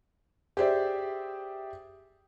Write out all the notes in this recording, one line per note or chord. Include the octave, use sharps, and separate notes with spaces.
G4 G#4 C5 D5 E5